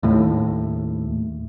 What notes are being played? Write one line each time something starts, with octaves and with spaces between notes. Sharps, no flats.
D#2 A2